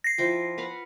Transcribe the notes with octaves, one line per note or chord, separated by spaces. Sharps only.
A#6 C7
F3 E4 G5
B4 F5 F#5